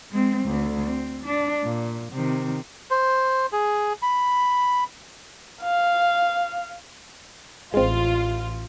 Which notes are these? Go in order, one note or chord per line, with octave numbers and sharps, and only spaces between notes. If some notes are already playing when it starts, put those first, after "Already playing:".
G#3 C4
D2
C4
D4
A#2
C3 D#3
C5
G#4
B5
F5
A1 G#3 C4 F4